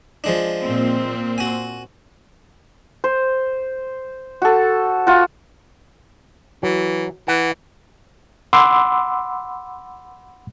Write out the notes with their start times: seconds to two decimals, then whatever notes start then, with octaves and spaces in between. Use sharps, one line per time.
0.24 F3 G#3 D4
0.62 A#2 C4
1.38 F#4 G#5
3.04 C5
4.42 F#4 A4
5.07 F4 F#4
6.63 E3 F#3
7.28 E3 F#5
8.53 F#5 B5 C6 D6 E6